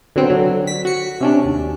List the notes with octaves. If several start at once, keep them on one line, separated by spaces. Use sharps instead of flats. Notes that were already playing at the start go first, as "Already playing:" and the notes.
D3 F#3 B3 C4
D3 F#3
B6
F#4 C#7
C3 C#4 D4
D#2